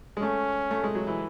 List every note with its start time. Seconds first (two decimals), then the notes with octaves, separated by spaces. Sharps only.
0.17 G#3
0.21 A3 C#4
0.71 A3
0.84 G#3
0.95 F#3
1.07 E3